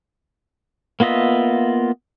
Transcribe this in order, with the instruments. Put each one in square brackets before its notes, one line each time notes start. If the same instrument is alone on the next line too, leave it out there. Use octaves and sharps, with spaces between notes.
[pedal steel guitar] A#3 B3 F4 D#5 E5